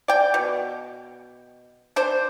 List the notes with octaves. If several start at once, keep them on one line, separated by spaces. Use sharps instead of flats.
D5 G5
B2
D4 C5